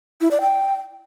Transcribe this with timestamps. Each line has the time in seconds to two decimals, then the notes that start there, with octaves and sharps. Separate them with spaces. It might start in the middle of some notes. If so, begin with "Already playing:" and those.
0.21 E4
0.31 D5
0.41 G5